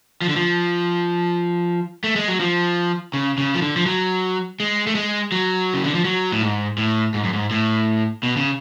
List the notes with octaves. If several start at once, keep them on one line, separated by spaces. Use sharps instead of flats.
F3
D3
F3
A3
G#3
F#3
F3
C#3
C#3
F3
D3
F3
F#3
G#3
A3
G#3
F#3
C#3
D3
F3
F#3
A2
G#2
A2
G#2
F#2
G#2
A2
B2
C#3